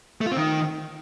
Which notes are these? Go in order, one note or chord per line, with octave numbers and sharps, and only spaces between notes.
A3
F4
C4
D#3